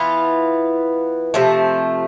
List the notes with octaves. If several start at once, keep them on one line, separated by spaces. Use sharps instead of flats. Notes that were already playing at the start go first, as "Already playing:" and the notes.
Already playing: E3 B3 F4
C3 F3 A3